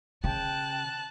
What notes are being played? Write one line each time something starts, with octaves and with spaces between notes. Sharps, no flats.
C#3 G5 A5 F#6